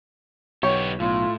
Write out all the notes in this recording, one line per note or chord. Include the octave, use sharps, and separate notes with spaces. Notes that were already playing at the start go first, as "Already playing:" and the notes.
B1 B3 G4 C#5
B1 A2 F4